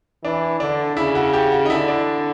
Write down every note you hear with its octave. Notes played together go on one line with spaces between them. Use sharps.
E3 D4
D3 D4
C#3 E4
F#4
G4
F#4
D#4
D3 E4
D4